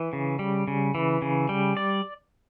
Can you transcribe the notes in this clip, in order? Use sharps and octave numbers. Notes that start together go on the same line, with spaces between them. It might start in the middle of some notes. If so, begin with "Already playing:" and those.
Already playing: E3
C#3
G3
C#3
E3
C#3
G3
D5